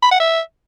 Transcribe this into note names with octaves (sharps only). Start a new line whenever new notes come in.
B5
F#5
E5